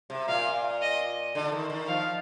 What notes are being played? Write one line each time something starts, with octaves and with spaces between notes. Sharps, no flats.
C3
A#2 F5
D#5
D3
D#3
D#3
F3 F5